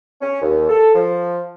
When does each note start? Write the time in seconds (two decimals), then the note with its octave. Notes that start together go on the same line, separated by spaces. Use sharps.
0.21 C#4
0.41 D#2
0.69 A4
0.94 F3